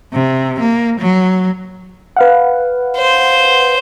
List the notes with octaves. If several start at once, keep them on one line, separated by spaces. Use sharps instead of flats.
C3
A#3
F#3
B4 F5 F#5
C5